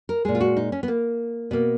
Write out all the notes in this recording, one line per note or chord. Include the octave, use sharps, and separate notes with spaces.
A#4
A#2 G#3 G#4
F4
F#4
D#4
C#4
B3
A#3
B2 A#3